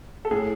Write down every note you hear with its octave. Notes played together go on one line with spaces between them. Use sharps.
A4
A2 G#4